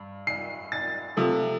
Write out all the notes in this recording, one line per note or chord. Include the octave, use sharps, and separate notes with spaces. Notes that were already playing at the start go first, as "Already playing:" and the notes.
Already playing: G2
C7
A6
C3 F3 A3